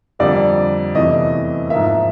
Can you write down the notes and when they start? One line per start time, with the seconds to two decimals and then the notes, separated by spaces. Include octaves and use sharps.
0.19 F2 D3 G3 A#3 D5
0.95 E2 C3 E3 A3 D#5
1.70 G#2 F3 A#3 E5